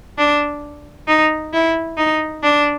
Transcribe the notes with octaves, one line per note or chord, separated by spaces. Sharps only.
D4
D#4
E4
D#4
D4